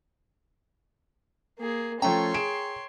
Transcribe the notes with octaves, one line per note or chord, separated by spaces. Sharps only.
A#3 G#4
F3 A3 C#4 C#5 G5 A#5 C6
G#4 D7 E7